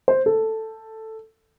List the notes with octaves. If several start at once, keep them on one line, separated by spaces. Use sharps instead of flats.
C5
A4